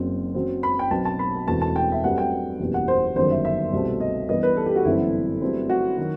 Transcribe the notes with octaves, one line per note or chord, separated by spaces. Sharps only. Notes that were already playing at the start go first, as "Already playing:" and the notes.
Already playing: F#1 F#2 F#3 C4
F#2 F#3 C4
B5
G5
B1 B2 F#3 C4 A5
A5
B5
E1 E2 B2 A3 C4 A5
A5
G5
E5
G2 F#3 A3 C4 F#5
G5
F#1 E2 B2 G3
F#5
C5
G1 F#2 D#3 C5
E5
E5
C2 B2 A3 C4
D#5
G2 E3 G3 B3 D#5
B4
A4
G4
F#4
G1 F#2 E3 A3 C4 E4
G2 F#3 A3 C4
F#4
D#3 F#3